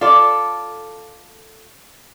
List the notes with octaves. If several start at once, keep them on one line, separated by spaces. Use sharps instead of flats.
F4 A4 D5